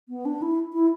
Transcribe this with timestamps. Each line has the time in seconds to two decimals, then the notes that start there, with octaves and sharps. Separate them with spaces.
0.09 B3
0.25 D4
0.42 E4
0.73 E4